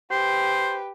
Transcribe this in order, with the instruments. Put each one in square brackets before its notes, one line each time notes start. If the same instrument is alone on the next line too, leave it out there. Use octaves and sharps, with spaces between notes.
[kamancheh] G4 B4 [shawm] C5